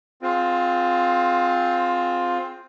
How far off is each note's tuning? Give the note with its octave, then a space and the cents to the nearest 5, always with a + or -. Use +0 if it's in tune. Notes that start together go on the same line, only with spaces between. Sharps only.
C4 +0 F4 +20 G#4 +20